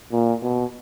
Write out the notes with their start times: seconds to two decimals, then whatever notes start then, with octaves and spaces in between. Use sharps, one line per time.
0.12 A#2
0.43 B2